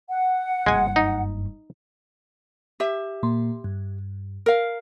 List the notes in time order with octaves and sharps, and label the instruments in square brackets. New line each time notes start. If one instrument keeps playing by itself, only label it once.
[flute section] F#5
[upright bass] F#1 G2 [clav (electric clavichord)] G#3 G#5
[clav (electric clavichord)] D#4
[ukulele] G4 E5
[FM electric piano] A#2 A#3 C6
G2
[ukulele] A#4 F5